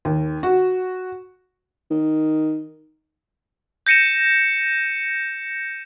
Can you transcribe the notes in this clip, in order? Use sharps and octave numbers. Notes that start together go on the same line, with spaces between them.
D#2
F#4
D#3
G6 A#6 C#7 D#7 E7